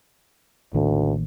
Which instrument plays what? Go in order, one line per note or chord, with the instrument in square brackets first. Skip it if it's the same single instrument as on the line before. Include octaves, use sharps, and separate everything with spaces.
[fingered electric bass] A1 D#3 A#3 [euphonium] D2 [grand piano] A2